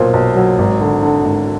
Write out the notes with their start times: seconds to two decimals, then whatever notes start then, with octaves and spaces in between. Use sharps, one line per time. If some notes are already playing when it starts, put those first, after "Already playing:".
Already playing: B1 A#2 C5
0.13 B1
0.36 F#3
0.58 G#1
0.80 D3
1.03 D3
1.25 G#1